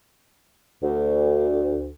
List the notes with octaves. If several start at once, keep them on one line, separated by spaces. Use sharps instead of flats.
D2